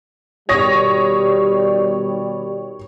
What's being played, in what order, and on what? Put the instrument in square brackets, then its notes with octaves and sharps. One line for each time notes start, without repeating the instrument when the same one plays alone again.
[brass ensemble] B2 D#3 G3 [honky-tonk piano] C#5 D#6 A#6